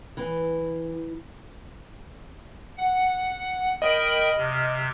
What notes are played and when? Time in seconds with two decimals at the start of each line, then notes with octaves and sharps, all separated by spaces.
0.17 E3
2.77 F#5
3.82 A#4 D#5 G5 B5
4.37 C3 F6